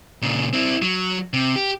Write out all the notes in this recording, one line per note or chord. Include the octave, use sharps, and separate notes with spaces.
A#2 C#3
C4 E4
F#3
C3
G4